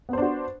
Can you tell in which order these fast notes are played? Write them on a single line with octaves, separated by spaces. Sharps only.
B3 C5 D4 F#4